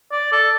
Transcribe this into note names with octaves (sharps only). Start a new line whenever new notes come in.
D5
A4